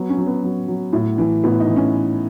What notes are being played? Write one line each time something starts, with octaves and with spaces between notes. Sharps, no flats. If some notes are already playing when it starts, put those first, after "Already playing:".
Already playing: F#3 B3
C#4
F#3
B3
F#3
F#3
A2
E3
A2 B3
D#4
E3
C#4